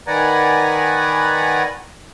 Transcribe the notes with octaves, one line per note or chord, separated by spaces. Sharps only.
D#3 B4 D5 F#5 G#5 A#5